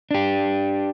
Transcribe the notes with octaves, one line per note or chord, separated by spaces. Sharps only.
D4 G4